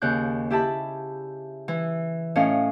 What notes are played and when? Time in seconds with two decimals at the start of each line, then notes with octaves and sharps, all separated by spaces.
0.02 D#2 C#3 F#6 G6
0.51 E4 G4 E5 A5 B5
1.68 E3
2.35 A2 C#4 D#5 F5